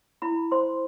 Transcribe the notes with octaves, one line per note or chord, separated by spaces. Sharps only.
E4 B5
C5 C6